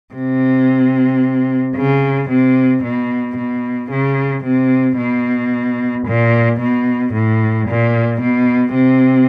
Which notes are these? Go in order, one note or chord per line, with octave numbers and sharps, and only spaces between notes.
C3
C#3
C3
B2
B2
C#3
C3
B2
A#2
B2
A2
A#2
B2
C3